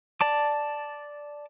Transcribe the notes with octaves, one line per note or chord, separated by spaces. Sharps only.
D5 A5 D6